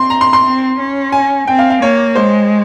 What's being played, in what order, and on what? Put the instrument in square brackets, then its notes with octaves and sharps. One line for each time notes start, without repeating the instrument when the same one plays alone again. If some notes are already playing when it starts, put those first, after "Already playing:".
Already playing: [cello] C4 [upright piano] C6
[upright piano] A#5
C6
C6
[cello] C4
C#4
[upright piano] G#5
[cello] C4 [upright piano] G5
[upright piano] F5
F5
[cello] A#3 [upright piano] C#5
[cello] G#3 [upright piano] C5